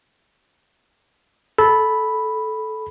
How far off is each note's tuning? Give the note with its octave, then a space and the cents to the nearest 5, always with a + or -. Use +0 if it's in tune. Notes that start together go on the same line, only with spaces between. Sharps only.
A4 -15 B5 +0